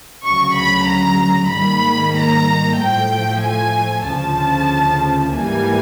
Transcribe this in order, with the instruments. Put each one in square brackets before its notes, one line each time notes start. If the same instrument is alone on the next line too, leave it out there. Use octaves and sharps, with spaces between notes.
[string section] D2 C#3 F#3 C#6
B5
A#5
G#2 D#3 G3 A#3 B5
A#5
A2 F3 A3 G5
G#5
D2 C#3 F3 A5
G#2 E3 G3 A#3 G#5